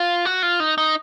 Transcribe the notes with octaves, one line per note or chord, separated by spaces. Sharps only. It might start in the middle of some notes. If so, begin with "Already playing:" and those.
Already playing: F4
F#4
F4
D#4
D#4